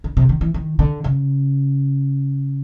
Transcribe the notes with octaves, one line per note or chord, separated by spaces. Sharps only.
D3
C3
D#3
E3
D#3
D3
C#3